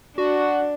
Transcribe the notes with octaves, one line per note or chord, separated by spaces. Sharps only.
D4 F#4